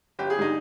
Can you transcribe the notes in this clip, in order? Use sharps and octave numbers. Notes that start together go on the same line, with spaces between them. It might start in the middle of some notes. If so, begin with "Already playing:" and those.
G1 G4
G#4
D3 G3 D#4